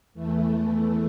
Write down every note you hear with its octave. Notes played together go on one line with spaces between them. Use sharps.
E2 E3 A3